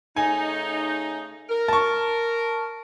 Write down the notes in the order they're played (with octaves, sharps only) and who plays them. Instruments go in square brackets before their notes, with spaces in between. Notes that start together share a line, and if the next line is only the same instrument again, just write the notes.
[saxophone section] C#3 A3 D#4 [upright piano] G#5
[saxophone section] A#4
[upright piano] A5 C#6